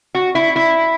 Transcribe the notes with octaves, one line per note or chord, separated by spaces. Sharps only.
F#4
E4
E4